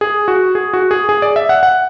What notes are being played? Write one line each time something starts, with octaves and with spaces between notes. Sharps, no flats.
G#4
F#4
G#4
F#4
G#4
G#4
D5
E5
F#5
F#5